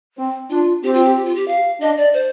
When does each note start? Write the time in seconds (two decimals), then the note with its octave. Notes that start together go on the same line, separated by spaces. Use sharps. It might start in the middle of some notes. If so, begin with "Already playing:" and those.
0.18 C4
0.50 D4 F4
0.83 C4 G4
0.94 F4
1.04 G4
1.16 G4
1.25 F4
1.35 G4
1.48 F5
1.81 D4 D#5
1.97 D5
2.14 C5